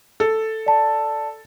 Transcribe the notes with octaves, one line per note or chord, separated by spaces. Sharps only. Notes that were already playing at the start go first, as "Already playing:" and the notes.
A4
D5 A5